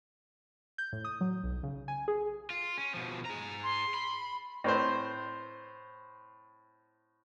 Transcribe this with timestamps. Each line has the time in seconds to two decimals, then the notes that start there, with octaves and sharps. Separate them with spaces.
0.78 G6
0.93 A2
1.05 D#6
1.21 F#3
1.44 B1
1.63 C#3
1.88 G#5
2.08 G#4
2.50 F4
2.78 C#4
2.94 B2 F3
3.26 G#4 A#5
3.64 C6
3.94 B5
4.64 A2 C4 C5